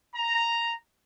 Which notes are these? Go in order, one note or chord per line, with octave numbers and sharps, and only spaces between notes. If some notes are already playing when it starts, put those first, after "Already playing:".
A#5